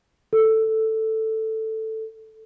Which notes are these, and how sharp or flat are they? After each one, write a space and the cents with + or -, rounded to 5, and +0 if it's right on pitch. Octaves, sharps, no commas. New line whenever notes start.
A4 +5